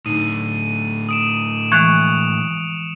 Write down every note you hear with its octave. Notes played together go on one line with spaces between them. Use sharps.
A2 D3 D#4 D#7
D#6 D7 E7
E3 F3 G#3 C#6 F#6 C#7 D7 F7